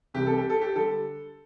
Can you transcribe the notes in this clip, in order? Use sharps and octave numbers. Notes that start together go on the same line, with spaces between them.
C2 C3 E3 G3 G4
A4
G4
A4
G4
D3 G3 A4